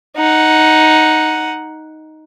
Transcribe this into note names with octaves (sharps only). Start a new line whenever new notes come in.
D#4 F#5